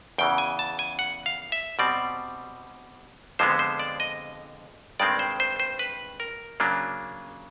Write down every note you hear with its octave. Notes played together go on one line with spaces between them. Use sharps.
E2 C#3 E3 G5
G#5
A5
G#5
F#5
F5
E5
B2 G3 C4 D5
F2 D3 F3 G#3 B3 C5
C5
D5
D#5
G2 D#3 G#3 C4 D5
C5
C5
C5
B4
A#4
C#3 F#3 A#3 D4